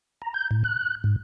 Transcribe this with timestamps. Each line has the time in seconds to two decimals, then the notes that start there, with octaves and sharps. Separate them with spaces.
0.22 A#5
0.34 G6
0.51 A2
0.64 F#6
1.04 G#2